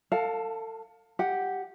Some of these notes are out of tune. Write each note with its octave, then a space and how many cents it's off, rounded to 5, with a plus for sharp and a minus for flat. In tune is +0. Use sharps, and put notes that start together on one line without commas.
A4 +35 F5 +20 A5 +0
G4 +0 F#5 +0